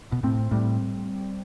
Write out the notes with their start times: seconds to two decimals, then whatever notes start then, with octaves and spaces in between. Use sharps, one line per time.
0.12 B2
0.23 A2 C4
0.51 A2 G3